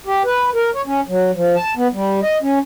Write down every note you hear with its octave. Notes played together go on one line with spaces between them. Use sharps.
G4
B4
A#4
C#5
C#4
F#3
F3
A5
B3
G3
D#5
C#4